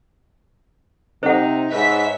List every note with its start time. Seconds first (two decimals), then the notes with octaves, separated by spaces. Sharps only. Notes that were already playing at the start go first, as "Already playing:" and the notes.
1.23 C3 D#4 C5 F#5
1.72 G#2 B4 C#5 E5 B6